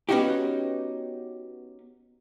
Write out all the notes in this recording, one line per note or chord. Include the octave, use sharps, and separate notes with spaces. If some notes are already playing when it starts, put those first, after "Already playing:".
B3 C#4 D#4 F#4 G4